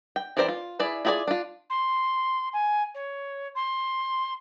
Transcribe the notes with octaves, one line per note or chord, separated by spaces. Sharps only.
G5
E3 C4 A#4 C5 D5
F4
E4 G#4 B4 D5
E4 F4 G#4 C#5 D5
D4 F4
C6
G#5
C#5
C6